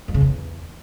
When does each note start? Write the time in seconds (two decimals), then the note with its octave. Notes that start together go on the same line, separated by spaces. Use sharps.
0.08 F2
0.14 C#3
0.21 E2